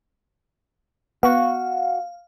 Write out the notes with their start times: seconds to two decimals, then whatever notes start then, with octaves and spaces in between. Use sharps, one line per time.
1.23 B3 F#4 F5